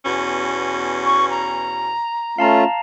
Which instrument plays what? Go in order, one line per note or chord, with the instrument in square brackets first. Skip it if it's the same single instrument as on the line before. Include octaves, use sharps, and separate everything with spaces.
[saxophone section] E2 B2 C#4
[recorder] C#6
A#5
[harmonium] A3 C#4 F4 [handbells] F5 A5 A#5